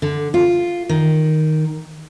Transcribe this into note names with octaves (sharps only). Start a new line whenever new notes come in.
D3
F4
D#3